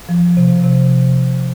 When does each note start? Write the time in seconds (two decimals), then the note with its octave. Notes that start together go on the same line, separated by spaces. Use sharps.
0.09 F3
0.37 C3
0.64 C3